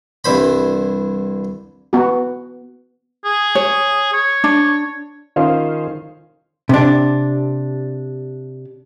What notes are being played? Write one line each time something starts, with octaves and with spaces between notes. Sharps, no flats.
C2 G2 E3 C5 B5
B3 F#4
G#4
C#5
C#5
D4
D#3 C#4 F4 C5 F5
C3 D4